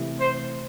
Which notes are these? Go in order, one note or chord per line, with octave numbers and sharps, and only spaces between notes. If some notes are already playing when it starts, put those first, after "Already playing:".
Already playing: C3 E3 A3 E4 G4
C5